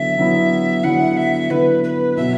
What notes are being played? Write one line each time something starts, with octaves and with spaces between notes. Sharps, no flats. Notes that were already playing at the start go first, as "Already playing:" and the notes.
Already playing: D3 F#3 B3 E4 E5
D3 F#3 B3 E4
D3 F#3 B3 E4 F#5
E5
D3 F#3 B3 E4 B4
B4
B2 F#3 B3 E5